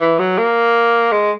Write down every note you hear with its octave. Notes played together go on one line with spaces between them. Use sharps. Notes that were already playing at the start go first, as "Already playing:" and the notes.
E3
F#3
A#3
G#3